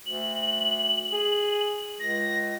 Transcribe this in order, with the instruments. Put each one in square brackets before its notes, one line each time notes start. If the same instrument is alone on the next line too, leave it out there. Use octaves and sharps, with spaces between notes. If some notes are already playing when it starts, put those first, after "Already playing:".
[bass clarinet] D2 [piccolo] F#7
[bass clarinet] G#4
[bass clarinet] C#2 [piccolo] A#6